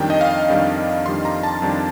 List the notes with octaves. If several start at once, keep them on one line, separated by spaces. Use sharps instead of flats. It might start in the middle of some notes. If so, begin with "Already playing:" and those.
Already playing: F2 D#3 G3 D4 G5
D#5
F5
F2 D#3 G3 D4
F2 D#3 G3 D4 C6
A#5
A5
F2 D#3 G3 D4